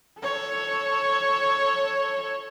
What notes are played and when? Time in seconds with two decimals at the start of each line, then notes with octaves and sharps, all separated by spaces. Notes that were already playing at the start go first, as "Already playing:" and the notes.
0.20 A4 C#5